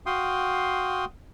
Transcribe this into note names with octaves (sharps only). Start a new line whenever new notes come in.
F#4 F5 G5 C6 D#6